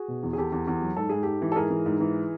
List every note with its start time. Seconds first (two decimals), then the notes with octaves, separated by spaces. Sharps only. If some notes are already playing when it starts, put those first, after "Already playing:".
Already playing: F#4 G#4
0.08 B2
0.23 E2
0.33 G#4
0.38 E2 G4 A4
0.52 E2
0.68 E2
0.82 F#3
0.97 G#2 A4
1.09 G#2 G#4
1.23 G#2 G4 A4
1.42 E3
1.52 A4
1.56 G#2 G#4 A#4
1.70 E3
1.86 G#2
2.00 E3